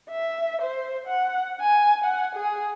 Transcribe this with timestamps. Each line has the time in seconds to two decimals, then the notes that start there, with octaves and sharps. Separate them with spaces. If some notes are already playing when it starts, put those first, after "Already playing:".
0.10 E5
0.62 C5
1.07 F#5
1.60 G#5
2.04 F#5
2.35 G#4